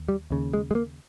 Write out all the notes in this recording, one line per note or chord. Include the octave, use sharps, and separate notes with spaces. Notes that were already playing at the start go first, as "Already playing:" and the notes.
Already playing: D#2
G3
D#2 C#3
G#3
G#3
A#3